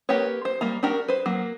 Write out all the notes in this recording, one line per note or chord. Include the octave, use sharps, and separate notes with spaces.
A#3 G4 A#4 B4 C#5
C5
G3 A#3 A#5
D4 F#4 G4 A#4
B4 C5
F#3 A#3